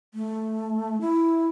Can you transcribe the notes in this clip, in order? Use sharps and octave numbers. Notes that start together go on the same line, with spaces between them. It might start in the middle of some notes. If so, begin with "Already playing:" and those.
A3
E4